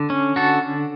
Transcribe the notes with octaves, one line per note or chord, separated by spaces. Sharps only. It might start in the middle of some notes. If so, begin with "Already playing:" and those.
Already playing: D3
C#4
D3 F#4 A4